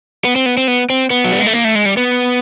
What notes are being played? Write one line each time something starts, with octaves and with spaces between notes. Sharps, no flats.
B3
C4
B3
C4
B3
C4
B3
F#3
G3
G#3
A3
A#3
A3
G#3
G3
B3